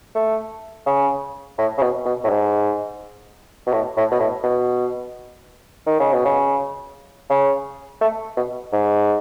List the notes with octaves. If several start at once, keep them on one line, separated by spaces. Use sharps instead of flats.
A3
C#3
A2
C#3
B2
B2
A2
G#2
B2
A2
A2
B2
A2
B2
D#3
C#3
B2
C#3
C#3
A3
B2
G#2